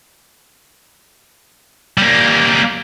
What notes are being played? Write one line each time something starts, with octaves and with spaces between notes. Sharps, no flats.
G3 A#3